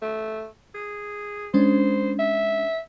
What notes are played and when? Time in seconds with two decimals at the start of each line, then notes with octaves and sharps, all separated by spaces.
0.02 A3
0.75 G#4
1.54 G#3 C#4 D4 C5
2.19 E5